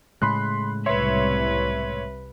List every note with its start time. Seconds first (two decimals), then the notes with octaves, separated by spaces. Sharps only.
0.22 A2 C#3 G#3 B5 C6 F#6
0.86 C2 B4 C#5 E5 C6